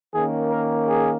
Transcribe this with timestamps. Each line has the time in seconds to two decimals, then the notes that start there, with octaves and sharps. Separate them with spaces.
0.14 D#3 A#3 C#4 G#4
0.51 A#4
0.88 G#4